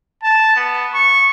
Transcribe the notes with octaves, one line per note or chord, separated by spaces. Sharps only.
A5
B3
C#6